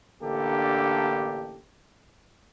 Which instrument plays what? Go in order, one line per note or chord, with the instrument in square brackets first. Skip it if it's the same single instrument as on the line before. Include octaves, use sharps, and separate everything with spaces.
[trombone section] A1 D3 A#3 D4 G4 A4